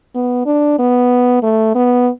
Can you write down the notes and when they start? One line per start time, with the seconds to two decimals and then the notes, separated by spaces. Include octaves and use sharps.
0.15 B3
0.46 D4
0.79 B3
1.43 A3
1.75 B3